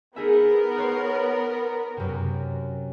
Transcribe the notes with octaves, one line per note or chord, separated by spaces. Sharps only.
B3 D#4 G#4 A#4 E5
C5 C#5 F#6
F#2 C3